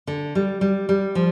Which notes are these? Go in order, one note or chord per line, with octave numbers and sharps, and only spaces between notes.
D3
G3
G3
G3
F3